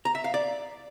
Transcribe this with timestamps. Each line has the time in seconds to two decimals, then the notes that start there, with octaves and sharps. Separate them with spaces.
0.05 A#5
0.15 E5
0.24 F5
0.34 D5